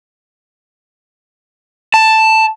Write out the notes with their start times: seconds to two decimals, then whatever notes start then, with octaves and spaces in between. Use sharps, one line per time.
1.94 A5